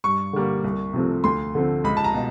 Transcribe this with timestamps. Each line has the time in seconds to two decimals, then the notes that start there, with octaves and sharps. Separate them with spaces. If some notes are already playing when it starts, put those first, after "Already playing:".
0.04 G2 C#6
0.33 D3 G3 A#3
0.64 C2
0.93 C3 F3 A3 C4
1.24 D2 C6
1.55 D3 F3 A3 C4
1.84 C#2 B5
1.97 A5
2.04 A#5
2.14 B2